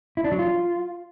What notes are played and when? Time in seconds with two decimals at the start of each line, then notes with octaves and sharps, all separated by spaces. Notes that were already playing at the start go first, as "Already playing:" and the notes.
0.17 E4
0.24 D4
0.32 F#3
0.39 F4